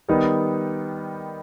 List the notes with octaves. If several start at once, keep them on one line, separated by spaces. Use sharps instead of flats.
D#3 G3 B3 D#4